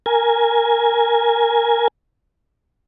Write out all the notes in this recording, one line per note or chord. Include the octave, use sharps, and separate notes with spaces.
A#4 G#5